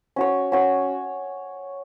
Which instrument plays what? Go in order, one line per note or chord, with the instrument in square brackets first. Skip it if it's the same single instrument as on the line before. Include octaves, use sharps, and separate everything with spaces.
[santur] C#4 F#4 C#5
C#4 F#4 C#5